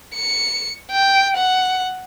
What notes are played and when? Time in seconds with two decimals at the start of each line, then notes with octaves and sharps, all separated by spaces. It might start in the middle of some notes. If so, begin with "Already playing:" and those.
0.15 C#7
0.91 G5
1.37 F#5